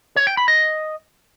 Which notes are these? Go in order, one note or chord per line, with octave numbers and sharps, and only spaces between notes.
C#5
G5
B5
D#5